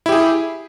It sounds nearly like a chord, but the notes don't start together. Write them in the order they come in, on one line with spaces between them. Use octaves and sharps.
E4 G4 G#4